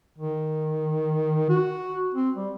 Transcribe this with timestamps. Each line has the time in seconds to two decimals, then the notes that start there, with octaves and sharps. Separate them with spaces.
0.18 D#3
1.50 F#4
2.15 C4
2.37 G3